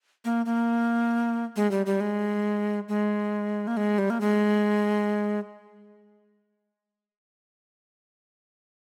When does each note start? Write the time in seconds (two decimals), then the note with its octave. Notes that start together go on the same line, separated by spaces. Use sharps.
0.25 A#3
0.46 A#3
1.56 G#3
1.71 G3
1.86 G3
2.00 G#3
2.89 G#3
3.67 A#3
3.77 G#3
3.98 G3
4.10 A#3
4.21 G#3